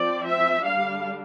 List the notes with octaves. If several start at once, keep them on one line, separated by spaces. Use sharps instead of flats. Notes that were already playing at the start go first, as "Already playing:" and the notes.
Already playing: F3 C4 D5
E5
D3 G3 D4 F5